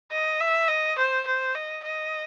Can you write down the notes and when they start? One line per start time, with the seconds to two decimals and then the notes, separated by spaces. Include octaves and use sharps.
0.12 D#5
0.40 E5
0.68 D#5
0.98 C5
1.27 C5
1.55 D#5
1.84 D#5